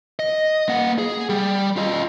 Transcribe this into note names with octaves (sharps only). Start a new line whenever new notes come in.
D#5
A#3 F#5
G#4
G3
F4 D#5